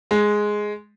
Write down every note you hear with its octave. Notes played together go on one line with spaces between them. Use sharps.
G#3